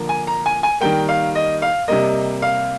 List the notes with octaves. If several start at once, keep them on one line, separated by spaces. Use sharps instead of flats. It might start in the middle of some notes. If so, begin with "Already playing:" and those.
Already playing: D3 F3 A#3
G#5
A#5
G#5
G#5
D#3 G3 A#3 G5
F5
D#5
F5
C3 G3 A#3 D#5
F5